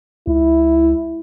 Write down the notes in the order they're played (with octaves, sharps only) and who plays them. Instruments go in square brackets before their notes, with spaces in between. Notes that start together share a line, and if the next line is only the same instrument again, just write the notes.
[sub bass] C#2 [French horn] E4